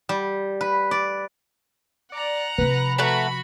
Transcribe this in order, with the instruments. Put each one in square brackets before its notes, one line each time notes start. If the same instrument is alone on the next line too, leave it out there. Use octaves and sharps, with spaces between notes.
[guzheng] G3
B4
D5
[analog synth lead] D5 [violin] F#5 A#5
[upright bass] C3 F3 [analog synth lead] B4
[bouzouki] A3 F#5 A#5 [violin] F#4 B5